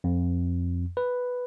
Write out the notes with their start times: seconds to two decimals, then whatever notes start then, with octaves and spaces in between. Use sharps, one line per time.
0.04 F2
0.97 B4